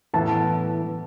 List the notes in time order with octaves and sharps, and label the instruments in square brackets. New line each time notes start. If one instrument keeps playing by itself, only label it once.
[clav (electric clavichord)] A2 E3 B3 [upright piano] A5